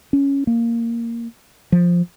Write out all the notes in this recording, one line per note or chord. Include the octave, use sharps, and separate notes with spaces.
C#4
A#3
F3